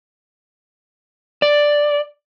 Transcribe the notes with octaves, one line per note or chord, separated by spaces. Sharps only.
D5